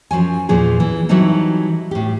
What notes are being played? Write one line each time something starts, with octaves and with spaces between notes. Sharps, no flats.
F#2 F3 F#3 G#5
E2 A#2 F3 G#4
E3
E3 F#3 G3 C4 D#4 A4
A2 G4